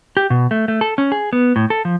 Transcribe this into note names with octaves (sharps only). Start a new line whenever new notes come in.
G4
B2
A3
A3
A4
C#4
G#4
B3
A2
A4
F3